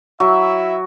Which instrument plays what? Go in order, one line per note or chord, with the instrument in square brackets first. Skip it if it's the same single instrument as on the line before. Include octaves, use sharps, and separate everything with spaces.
[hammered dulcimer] F#3 [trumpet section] E4 E5